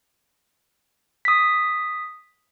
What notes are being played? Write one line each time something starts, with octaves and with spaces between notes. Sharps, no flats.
D#6 B6